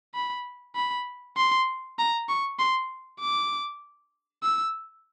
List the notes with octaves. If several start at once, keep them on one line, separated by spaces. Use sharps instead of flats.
B5
B5
C6
A#5
C#6
C6
D6
E6